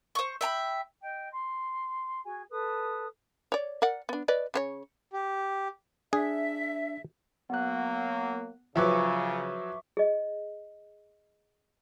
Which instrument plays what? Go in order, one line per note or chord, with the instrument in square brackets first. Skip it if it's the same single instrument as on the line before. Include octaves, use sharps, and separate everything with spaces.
[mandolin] C5 C#6
E5 G5 A#5 B5
[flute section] D#5 G5
C6
F#4 G#4 G#5
A4 B4 D#6
[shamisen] C#5 D5
A#4 D5 F#5
B3 D4
B4 D5 D#5
C#3 C4 C#5
[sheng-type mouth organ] G4
[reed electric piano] D4 [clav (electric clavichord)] G#4 [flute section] E5
[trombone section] F#3 A#3 [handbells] B3 F#6
[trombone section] C#3 [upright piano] F3 F#3 B4 [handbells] E5 C#6 D6
[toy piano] G#4 D#5